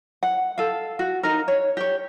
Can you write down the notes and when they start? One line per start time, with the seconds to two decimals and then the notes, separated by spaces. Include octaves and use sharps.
0.23 F#5
0.58 A4 F5
0.99 F#4
1.23 D#4 A#4
1.48 C#5
1.77 G4 C#5